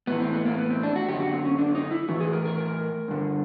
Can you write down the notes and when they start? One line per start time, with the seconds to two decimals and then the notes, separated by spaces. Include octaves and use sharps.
0.07 A2 E3 B3
0.20 C4
0.33 B3
0.46 A#3
0.58 B3
0.70 C4
0.83 D4
0.96 F#4
1.08 F#2 D3 G4
1.20 F#4
1.33 C4
1.45 C#4
1.59 D4
1.75 D#4
1.91 E4
2.08 A2 E3 F#4
2.20 G#4
2.33 A#4
2.45 A#4
2.58 A#4
3.08 G2 D3